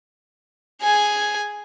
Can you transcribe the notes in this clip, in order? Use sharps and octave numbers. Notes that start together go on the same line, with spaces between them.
G#4 G#5